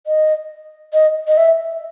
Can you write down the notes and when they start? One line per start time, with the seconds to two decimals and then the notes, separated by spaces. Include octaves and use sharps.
0.07 D#5
0.93 D#5
1.27 D#5
1.37 E5